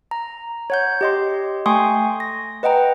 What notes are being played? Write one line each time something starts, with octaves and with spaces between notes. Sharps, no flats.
A#5
C#5 F#5 G6
G4 D#5 C6
A3 G5 G#5 C6 C#6 D#6
A#6
B4 D#5 F#5 G5 A#5